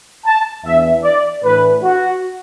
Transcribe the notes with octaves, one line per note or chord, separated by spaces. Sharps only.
A5
E2 E3 B3 D4 E5
D5
A2 E3 D4 B4
F#4